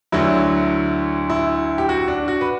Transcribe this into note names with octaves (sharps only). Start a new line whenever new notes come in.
D2 D3 F#3 E4
E4
G4
F#4
D4
F#4
B4